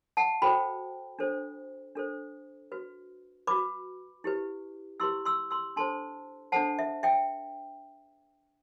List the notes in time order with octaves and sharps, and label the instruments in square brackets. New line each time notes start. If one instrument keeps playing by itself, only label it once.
[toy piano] F#5 A5
F#4 A4 C5 G5 B5
D4 A4 C5
D4 A4 C5
F#4 B4
F#4 B4 B5 D6
E4 G4 B4
E4 G4 B4 C6 E6
C6 E6
C6 E6
D4 A4 C5 A5 C6
D4 A4 C5 F#5 A5
E5
E5 G5